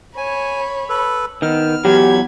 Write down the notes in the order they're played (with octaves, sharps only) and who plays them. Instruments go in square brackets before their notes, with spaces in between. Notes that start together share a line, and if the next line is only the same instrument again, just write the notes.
[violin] C#5 B5 [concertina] G#5
[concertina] A4 B4
[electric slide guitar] D#3 [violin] B3 [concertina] F6
[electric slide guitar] E2 F#3 [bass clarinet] G4 [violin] B5 G#6